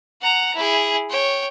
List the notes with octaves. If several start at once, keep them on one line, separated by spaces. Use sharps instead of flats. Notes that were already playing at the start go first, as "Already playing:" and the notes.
F#5 A#5
E4 G#4
C#5 G5